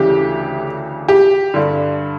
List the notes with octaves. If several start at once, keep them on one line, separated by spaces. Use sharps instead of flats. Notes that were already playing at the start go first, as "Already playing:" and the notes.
Already playing: D2 C#3 E3 G4
G4
G2 D3